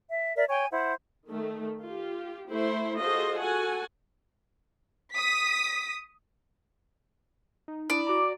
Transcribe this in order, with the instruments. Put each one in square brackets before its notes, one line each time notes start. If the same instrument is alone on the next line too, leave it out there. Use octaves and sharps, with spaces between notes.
[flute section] E5
A#4 D5 E5
C#5 G5 G#5
E4 C5 F#5
[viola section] D#3 A3
F4 G4
A3 E4 C5
F4 F#4 G#4 A4 C5 D#5
F#4 A4 F#5 G#5
[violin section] D#6 B6
[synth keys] D#4
[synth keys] D4 D#6 [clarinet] E4 [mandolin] D5
[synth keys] F#4 A#5 [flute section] D6